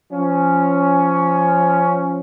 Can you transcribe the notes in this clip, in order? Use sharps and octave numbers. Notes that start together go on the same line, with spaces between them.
F3 C#4